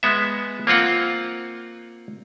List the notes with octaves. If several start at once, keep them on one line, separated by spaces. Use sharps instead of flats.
G#3 B3 E5
A#3 C4 F4 F#5